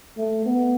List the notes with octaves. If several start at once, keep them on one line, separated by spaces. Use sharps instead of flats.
A3
B3